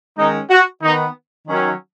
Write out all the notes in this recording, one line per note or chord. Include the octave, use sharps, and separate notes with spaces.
D#3 G#3 C#4 D#4
F#4
D#3 B3 D#4
D#3 F#3 C#4